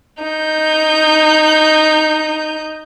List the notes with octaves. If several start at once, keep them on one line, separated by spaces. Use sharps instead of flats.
D#4 G6